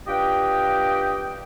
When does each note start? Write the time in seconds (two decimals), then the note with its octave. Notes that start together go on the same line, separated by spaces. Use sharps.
0.08 D4 F4 G4 B4 D#5 G5